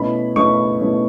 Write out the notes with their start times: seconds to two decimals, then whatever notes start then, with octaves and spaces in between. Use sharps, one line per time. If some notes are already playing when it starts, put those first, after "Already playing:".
Already playing: B2 A3 C#4 E4 B5
0.36 B2 A3 C#4 E4 C#6
0.81 B2 A3 C#4 E4